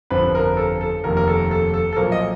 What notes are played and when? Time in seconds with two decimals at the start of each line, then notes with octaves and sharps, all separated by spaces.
0.10 G1 F2 D3 F3 B4
0.35 A#4
0.57 A4
0.81 A4
1.04 F1 D#2 D#3 A#4
1.17 A#4
1.28 A4
1.51 A4
1.74 A4
1.93 A4
1.96 B1 A#2 F3 A#4
2.12 D#5